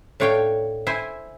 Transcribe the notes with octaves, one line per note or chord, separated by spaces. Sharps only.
A2 D4 C#5 F5 G5
E4 C5 G#5